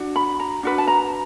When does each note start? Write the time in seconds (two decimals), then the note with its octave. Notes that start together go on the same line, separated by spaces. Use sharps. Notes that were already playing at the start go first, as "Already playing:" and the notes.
Already playing: D4 F#4
0.16 B5
0.40 A#5
0.63 D4 F#4 B4
0.78 A5
0.87 A#5